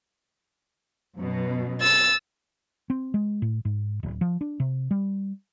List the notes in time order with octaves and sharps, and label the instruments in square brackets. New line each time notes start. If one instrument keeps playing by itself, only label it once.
[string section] F#2 B2
[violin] E6 A6
[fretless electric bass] C4
G#3
A2
G#2
D1
F3
D4
C3
G3